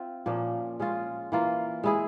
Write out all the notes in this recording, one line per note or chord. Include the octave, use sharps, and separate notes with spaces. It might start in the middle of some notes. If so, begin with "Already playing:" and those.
Already playing: C4 F4 E5
A#2 F3 A#3 C#4
G#3 C#4 F4
E3 A#3 F4
G#3 E4 G#4